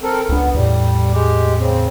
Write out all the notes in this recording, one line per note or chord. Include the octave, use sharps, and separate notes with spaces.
C4 A4 A#4
C#2 B3 D4
E2 A2 G3
G#3 G4
C#3 C4